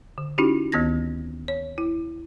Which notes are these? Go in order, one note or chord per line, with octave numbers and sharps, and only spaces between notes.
D3
C#4 D#4 E4 F#4 G4
D2 D#3 B3 G#6 A#6
C#5
E4